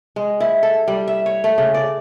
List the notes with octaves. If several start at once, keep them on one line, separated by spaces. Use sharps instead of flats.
G#3
E4
A4
G3
E5
C#5
A3
C#3
D5